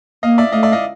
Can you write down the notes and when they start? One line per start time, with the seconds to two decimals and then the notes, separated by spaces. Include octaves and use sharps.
0.23 A#3 D#5 F5
0.38 D5 E5
0.52 A3 D#5 F5
0.63 D5 E5
0.72 D#5 F5